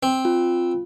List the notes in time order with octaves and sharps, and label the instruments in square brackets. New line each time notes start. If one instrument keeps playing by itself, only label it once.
[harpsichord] C4
[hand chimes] F4